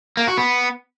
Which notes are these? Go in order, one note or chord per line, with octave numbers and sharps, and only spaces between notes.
A#3
F#4
B3